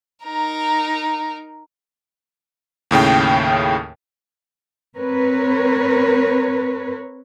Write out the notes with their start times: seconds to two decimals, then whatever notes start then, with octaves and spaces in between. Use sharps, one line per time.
0.24 D#4 A#4
2.91 D#2 A2 C#3 G5
4.96 C4 A#4 B4 C#5